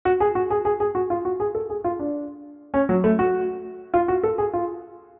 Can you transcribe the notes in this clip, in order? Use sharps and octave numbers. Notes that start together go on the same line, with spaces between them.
F#4
G#4
F#4
G#4
G#4
G#4
F#4
F4
F#4
G#4
A4
G#4
F4
D4
C#4
F#3
A3
F#4
F4
F#4
A4
G#4
F4